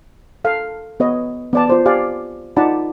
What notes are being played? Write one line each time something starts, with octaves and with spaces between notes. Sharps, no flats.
A4 F5
B3 B4 C#5 D#5
B3 D5 A5
F4 C5 D5
G4 D5 F5 G#5
D#4 F4 D5 F#5 A5 B5